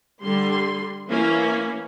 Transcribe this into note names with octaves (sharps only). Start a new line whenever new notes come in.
D3 G3 C6
E3 A#3 C#4 E4